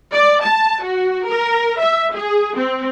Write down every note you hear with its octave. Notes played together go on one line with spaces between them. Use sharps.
D5
A5
F#4
A#4
E5
G#4
C4